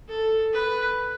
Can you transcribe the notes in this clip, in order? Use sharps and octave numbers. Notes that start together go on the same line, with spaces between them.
A4
B4